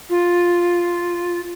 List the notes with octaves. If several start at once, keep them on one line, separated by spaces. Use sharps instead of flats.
F4